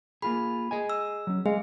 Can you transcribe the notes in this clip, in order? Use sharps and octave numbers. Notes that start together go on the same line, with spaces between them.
A#3 F4 G#4 B5
G#4 D#5 G#5
E6
F#3 C#4
G#3 G#4 F5